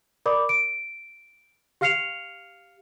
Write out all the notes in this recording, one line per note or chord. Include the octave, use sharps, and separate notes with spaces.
A#4 D5 B5 D6
D7
G4 F5 F6 C7 C#7 F7